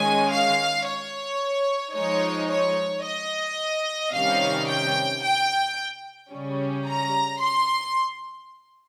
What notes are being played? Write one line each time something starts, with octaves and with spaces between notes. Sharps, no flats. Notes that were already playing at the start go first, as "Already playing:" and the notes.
Already playing: D#3 G#3 C#4 G#5
F5
C#5
F3 G#3 D#4 C#5
C#5
D#5
C3 D#3 G3 C#4 F5
G5
G5
C#3 G3 C#4
A#5
C6